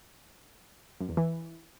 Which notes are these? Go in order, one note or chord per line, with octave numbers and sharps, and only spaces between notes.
F#2
E2
E3